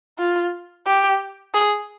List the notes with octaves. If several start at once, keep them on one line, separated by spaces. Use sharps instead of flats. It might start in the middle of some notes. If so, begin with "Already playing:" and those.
F4
G4
G#4